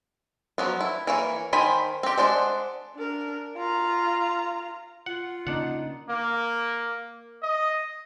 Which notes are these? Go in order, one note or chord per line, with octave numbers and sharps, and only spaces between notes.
F3 F#3 B3
E4
E3 A#3 C#5
D#3 C5 G#5 B5
C4 G4
G#3 D4 C5 D5 F#5
D4 A#4
F4 A#5
F4 F#5
C#3 A#3 D4 D#4 F#5
A#3
D#5